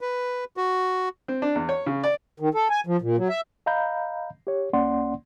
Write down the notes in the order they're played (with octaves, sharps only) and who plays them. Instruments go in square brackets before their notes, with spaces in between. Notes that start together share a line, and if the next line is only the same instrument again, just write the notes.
[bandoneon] B4
F#4
[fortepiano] C4
D4
E2
C#5
C#3
D5
[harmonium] D#3
A4
G#5
F3
A#2
F#3
E5
[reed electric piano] D#5 F5 A#5 B5 G6
G4 C#5
C2 A#3 C#4 D5 F#5 C6